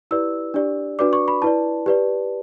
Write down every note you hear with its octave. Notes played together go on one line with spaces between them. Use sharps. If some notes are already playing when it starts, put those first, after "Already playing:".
E4 G4 B4 D5 E6
D4 G4 D5
D4 F#4 B4 D5 D6
C#6
B5
E4 B4 D5 A5
G4 B4 D5